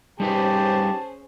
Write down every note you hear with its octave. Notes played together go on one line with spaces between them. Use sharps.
G3 C#4 D#4 G4 G#4 B4 C5 A5